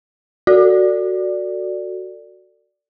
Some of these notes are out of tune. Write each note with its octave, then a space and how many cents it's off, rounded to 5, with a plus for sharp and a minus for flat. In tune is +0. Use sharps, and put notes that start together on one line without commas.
F#4 +0 A4 +35 D5 +0